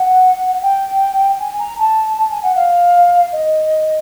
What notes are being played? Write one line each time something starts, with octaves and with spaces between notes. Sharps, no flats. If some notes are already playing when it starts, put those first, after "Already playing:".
Already playing: F#5
G5
G#5
A#5
A5
A5
G#5
F#5
F5
D#5